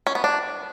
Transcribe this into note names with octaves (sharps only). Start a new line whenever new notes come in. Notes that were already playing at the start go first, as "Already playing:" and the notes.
C#4
B3
D4